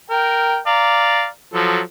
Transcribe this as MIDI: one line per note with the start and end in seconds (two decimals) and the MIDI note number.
0.10 0.58 70
0.10 0.58 79
0.67 1.27 74
0.67 1.27 77
0.67 1.27 82
1.54 1.80 53
1.54 1.80 54
1.54 1.80 69